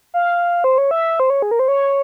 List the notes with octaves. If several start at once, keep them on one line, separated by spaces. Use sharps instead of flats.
F5
C5
C#5
E5
C5
C#5
G#4
A#4
C5
C#5